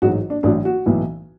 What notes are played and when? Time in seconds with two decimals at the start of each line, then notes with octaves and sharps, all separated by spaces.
0.02 A1 G#2 F#3 F#4
0.30 D4
0.43 A1 A2 F#3 D4
0.65 F#4
0.86 B1 A2 E3